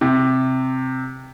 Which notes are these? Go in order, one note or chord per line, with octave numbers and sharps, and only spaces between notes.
C3